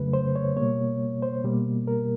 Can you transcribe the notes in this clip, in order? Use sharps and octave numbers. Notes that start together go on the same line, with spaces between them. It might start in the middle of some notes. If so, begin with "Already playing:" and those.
Already playing: F2 C#3 F#3 A3 B4
C5
C#5
B2 G3 A#3 C#5
C5
B2 G3 A#3
A#4